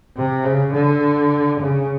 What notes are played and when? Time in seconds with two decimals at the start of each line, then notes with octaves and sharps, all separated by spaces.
0.16 C3
0.45 C#3
0.74 D3
1.61 C#3